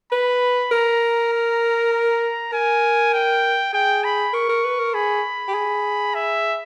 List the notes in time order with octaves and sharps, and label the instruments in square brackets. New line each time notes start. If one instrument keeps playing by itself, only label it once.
[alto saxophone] B4 [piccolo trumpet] B5
[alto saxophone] A#4 [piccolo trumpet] A#5
[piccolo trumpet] A#5
A#5
[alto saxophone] A#4 [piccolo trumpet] G#5
[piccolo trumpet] G5
[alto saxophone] G#4 [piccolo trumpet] G5
[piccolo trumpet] B5
[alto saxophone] A#4 [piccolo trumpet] C#6
[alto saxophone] A#4
B4
A#4
[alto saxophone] G#4 [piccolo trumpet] B5
[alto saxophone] G4
G#4
[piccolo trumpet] E5